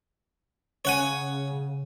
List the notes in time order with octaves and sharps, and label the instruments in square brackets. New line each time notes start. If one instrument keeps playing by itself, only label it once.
[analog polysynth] C#3 [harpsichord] C#5 F#5 G#5